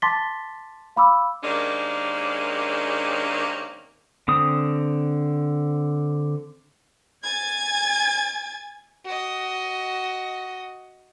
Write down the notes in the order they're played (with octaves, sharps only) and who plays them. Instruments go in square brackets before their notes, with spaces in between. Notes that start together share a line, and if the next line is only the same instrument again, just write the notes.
[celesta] A5 C6 D6 A6 B6 G7
F5 B5 D6 E6
[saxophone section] C3 D#3 G#3 A#3 C#4 D4
[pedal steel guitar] D3 C4 D#6
[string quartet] G#5 G#6 A6
[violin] F#4 D#5